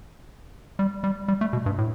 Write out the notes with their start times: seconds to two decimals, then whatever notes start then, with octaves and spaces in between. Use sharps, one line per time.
0.79 G3
1.04 G3
1.28 G3
1.41 A3
1.53 B2
1.66 G2
1.78 A2